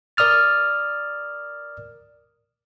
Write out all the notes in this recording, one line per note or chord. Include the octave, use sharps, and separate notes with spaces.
A#4 D5 D#6 F6 A6